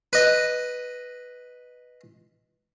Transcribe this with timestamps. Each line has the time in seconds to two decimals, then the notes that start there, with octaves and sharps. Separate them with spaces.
0.13 B4 D#5